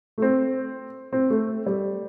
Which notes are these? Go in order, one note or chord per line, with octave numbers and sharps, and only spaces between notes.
A3
C4
C4
A3
G3